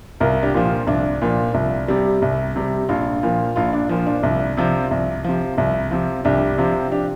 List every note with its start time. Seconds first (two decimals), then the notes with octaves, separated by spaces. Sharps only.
0.20 C2 F4 A#4
0.43 D4 G4
0.54 A#2 F3
0.65 F4
0.87 C2 D4
1.22 A#2 F3
1.54 C2
1.88 C3 G3
2.22 C2
2.56 C3 G3
2.89 A#1 F4
3.23 A#2 F3
3.56 A#1 F4
3.73 D4
3.89 A#2 F3
4.07 D4
4.23 C2
4.57 C3 F3
4.91 C2
5.24 C3 F3
5.58 C2
5.91 C3 F3
6.25 C2 D4 G4
6.58 C3 F3
6.91 D4 G4